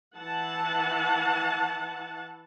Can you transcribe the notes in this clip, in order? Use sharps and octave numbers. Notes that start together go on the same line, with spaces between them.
E3 F#5 A5